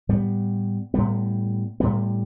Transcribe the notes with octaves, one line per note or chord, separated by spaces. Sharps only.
A2 G3 B3
A2 G3 B3
A2 G3 B3